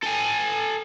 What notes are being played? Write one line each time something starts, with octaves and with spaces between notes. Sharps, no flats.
A4 G#5